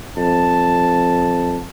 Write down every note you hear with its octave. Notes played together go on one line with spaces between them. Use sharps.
F2 A5